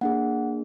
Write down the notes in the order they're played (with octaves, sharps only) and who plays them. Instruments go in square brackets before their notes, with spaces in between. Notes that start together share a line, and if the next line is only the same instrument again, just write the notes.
[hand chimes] A#3 D4 G#4 F#5